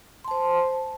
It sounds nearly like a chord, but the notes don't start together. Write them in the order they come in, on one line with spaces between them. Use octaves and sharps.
C6 A5 C5